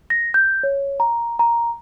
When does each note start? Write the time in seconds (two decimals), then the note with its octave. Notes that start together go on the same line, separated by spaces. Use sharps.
0.10 A#6
0.34 G6
0.63 C#5
1.00 A#5
1.39 A#5